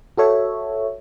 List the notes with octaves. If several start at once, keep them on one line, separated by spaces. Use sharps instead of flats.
F#4 A4 C#5 E5